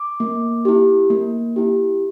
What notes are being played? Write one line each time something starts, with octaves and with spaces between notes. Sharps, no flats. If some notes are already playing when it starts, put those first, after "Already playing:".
Already playing: D6
A#3
E4 G4
A#3
E4 G4